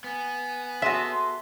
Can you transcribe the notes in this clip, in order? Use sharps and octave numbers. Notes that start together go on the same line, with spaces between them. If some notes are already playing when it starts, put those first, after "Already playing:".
B3 G#5
F#4 G#4 A4 E5 C6